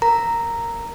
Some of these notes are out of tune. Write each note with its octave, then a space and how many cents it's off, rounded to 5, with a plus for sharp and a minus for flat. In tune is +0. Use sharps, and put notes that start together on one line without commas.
A#4 +0 A#5 -5